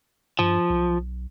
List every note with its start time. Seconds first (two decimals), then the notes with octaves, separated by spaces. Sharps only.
0.39 G2 F3
0.70 B1